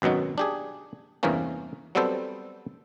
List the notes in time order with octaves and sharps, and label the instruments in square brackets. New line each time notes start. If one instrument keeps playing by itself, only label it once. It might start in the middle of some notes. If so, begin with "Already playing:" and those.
[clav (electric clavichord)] G#1 F#2 B2 F#3 D#4
D4 G4 G#4
E2 G2 C3 E3 A#3 C#4
F#3 G3 B3 C4 A4 C5